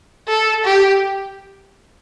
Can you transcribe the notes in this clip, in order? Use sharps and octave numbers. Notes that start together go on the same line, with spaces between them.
A4
G4